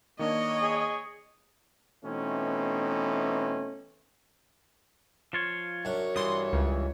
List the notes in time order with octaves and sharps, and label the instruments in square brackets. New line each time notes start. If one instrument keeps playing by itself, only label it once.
[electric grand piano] D#3 A#3 D4 [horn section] C#5 [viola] D#5
[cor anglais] G#4
[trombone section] B2 E3 A3 C4 C#4 D#4
[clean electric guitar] F3 F4 C#5
[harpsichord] F#2 D4 [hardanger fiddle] C#5
[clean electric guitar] G2 E3 [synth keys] C6 D#6
[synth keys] C#2